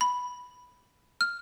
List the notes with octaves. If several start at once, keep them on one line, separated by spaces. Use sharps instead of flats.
B5
F6